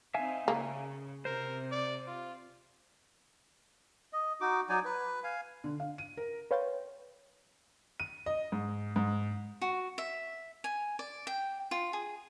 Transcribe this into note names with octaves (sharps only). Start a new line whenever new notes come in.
C4 D#4 E5 F5 G#5
C#3 A#3
C3 A#4 C5
D5
F4
D#5
D#4 F#4 D6
F#3 D#4 D5 G#5
B4
F5 G#5
D3
F5
D#7
A#4
B4 C#5 F5 G5 C6 A6
D#7
D#5
G#2
G#2
F#4
E5
G#5
D5
G5
F4
G#4